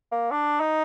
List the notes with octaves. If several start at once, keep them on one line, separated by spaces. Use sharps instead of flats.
A#3
D4
D#4